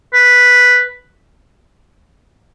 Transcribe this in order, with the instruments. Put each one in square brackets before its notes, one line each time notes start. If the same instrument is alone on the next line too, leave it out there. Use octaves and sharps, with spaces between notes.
[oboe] B4